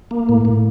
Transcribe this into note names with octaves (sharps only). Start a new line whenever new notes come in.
A#3
A2
A2